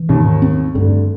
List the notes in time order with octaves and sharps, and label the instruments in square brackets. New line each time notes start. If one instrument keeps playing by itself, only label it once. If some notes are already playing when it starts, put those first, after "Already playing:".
Already playing: [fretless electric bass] E3
[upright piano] D#2 D#3 [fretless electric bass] G#2
[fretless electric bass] C4
[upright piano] D2 D3 [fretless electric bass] G2